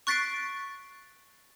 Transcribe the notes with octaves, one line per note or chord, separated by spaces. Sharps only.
C#6 F#6 A6 B6 C7 D7